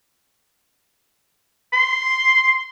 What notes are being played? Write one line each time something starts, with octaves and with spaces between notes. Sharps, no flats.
C6